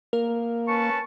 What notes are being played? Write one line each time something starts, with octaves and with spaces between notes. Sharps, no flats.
A#3 A#4
C#4 B4 A5 C#6